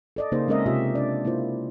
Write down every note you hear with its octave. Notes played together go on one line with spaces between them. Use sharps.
A4 D5 D#5
C#3 A#3 D#4 G#4 C5
G#3 C4 C#4 A#4 D#5 E5
C3 F4 G4 E5
D4 D5
A#3 E4 F4 C5